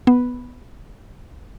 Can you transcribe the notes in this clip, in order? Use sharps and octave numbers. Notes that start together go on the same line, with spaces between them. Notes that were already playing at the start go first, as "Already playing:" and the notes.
B3